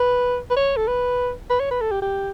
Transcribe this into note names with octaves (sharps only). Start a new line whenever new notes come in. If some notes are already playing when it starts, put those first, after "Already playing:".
Already playing: B4
B4
C#5
A4
B4
B4
C#5
B4
A4
G4
G4